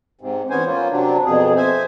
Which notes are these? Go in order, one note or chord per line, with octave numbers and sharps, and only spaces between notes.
G#2 C3
E2 B3 C#4 C5 G#5
A#3 C#4 F4
C3 F#3 D4
F2 B2 G#4
C5 E5 G#5